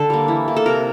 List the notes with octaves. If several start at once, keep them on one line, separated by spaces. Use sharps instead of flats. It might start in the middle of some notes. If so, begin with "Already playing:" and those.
Already playing: D3 A4
G3 A#3
E3
A#3
A4
C3 A#4